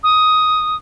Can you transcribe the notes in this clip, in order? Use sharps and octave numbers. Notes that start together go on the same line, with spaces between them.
D#6